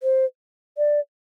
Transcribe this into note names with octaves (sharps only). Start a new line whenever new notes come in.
C5
D5